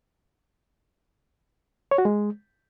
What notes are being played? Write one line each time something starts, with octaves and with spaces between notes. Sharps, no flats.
C#5
F#4
G#3